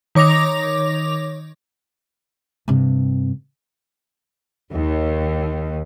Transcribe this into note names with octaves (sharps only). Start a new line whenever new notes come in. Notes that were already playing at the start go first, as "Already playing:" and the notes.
D#3 C#5 D6 A#6 F7
G2 C3
D#2